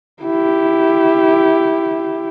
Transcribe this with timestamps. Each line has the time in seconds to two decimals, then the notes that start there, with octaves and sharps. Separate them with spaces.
0.23 E4 G4